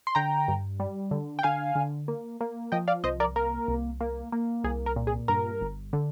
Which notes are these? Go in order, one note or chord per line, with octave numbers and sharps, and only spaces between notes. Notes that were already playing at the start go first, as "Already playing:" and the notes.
C6
D3 G5 A#5
G2
G3
D3
G5
D3 F5 G#5
D3
A#3
A#3
F3 D#5 G5
D5 F5
C2 C5 D#5
A#4 D5
A#3 A#4
C2
A#3
A#3
C2 G#4
A#4
A#2
G#4
G2 A#4
G1
D3